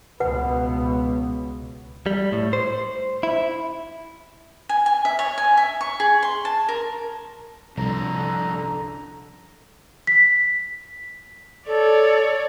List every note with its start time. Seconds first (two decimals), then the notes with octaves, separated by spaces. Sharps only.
0.20 C#2 B2 B3 B4 F#5
2.06 G3
2.32 A2
2.53 C5
3.23 E4
4.69 G#5
4.86 G#5
5.05 E5
5.19 C#5
5.38 G#5
5.57 E5
5.81 C#6
6.00 G#4
6.23 C6
6.45 A5
6.69 A#4
7.78 C2 G2 D3 F3 A#5
10.07 B6
11.66 A4 C#5 D5